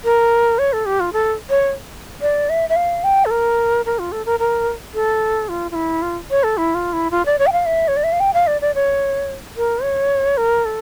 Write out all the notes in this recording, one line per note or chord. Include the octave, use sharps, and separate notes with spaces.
A#4
C#5
A4
G4
F4
A4
C#5
D5
E5
E5
F5
G5
A4
A#4
A#4
F4
A4
A#4
A#4
A4
F4
F4
E4
F4
C#5
A4
E4
F4
E4
F4
D5
C#5
G5
F5
E5
C#5
D5
E5
F5
G5
F5
D5
D5
C#5
A#4
C#5
A#4
A4